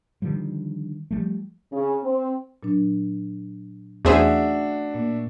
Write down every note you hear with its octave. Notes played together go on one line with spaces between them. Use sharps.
D3 D#3 F3 G3
F3 G3 A3
C#3
C4
A#2 F#3 D4
E2 A3 C#4 D4 F#4 G#4 C5 E5
A#2 A#3